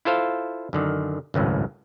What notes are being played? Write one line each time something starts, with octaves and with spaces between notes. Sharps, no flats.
E4 F4 A4 C5 F5
F#2 D3 D#3
G#1 C#2 F#2 A2